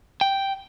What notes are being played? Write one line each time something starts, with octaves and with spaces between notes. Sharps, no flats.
G5